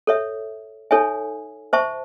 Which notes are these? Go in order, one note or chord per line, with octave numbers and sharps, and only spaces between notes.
A4 C#5 E5
D#4 A4 C#5 E5 G#5
C5 E5 A5 C#6